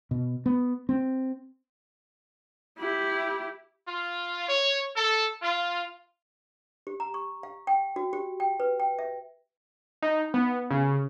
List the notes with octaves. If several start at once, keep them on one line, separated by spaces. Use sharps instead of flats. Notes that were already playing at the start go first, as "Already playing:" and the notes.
B2
B3
C4
E4 G4
F4
C#5
A4
F4
G4
A#5
C#6
F5
G5
F#4
G4
G5
B4
G5
E5
D#4
B3
C#3